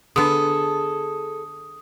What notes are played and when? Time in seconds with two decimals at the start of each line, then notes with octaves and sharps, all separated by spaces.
0.16 D3 B3 G#4 A4 D#6